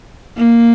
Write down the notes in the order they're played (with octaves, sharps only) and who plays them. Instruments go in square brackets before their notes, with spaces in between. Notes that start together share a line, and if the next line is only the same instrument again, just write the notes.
[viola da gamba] A#3